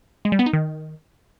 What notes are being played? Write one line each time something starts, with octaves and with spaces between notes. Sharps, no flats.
G#3
G3
B3
D#4
D#3